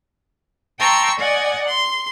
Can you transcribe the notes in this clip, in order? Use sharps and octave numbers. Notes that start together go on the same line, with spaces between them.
G5 A5 A#5 C6 C#6 E6
D5 D#5 F#5 G#5
C6